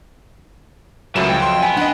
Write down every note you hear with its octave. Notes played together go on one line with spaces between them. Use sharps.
C#2 A2 E3 F#3 A#4 E5 E7
F2 G5
C6
B3 G#5
D4 D#5 F#5